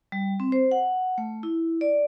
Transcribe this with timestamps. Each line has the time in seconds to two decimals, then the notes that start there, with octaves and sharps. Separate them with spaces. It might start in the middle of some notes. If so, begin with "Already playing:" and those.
0.12 G3
0.40 C4
0.52 C5
0.71 F#5
1.18 A3
1.43 E4
1.81 D5